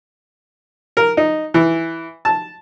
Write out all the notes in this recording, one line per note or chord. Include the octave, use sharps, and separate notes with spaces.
A#4
D#4
E3
A5